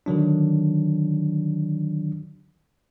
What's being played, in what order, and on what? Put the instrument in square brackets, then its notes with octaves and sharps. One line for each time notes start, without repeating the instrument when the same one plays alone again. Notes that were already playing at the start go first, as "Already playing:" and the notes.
[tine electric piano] D3 D#3 F#3 D4